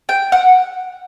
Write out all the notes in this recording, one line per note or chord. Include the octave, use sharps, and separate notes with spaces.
G5
F#5